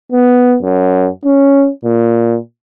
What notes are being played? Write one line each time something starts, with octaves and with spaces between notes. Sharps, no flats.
B3
F#2
C#4
A#2